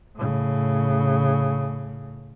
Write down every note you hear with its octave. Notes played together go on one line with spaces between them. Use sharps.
A2 C#3